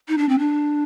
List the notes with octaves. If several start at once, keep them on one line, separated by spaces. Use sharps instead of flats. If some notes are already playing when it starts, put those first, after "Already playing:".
D#4
D4
C4
D4